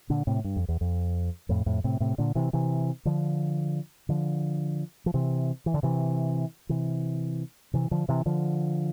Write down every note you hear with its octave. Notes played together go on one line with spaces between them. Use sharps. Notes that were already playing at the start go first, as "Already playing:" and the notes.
A#2 D3
A2 C3
G2
F2
E2
F2
F2 A2
F2 A2
A2 C3
A2 C3
A#2 D3
C3 E3
C3 E3
D3 F3
D3 F3
F3
C3 E3
E3
D3
C3 E3
C3 E3
C3 E3
D3 F3
C3 E3
D3 F3